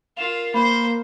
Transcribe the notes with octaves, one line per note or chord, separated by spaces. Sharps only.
F4 A#4 F5 C7 E7 F7
A#3 C5 B5